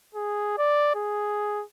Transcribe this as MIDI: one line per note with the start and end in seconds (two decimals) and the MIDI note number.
0.14 0.56 68
0.58 0.94 74
0.95 1.64 68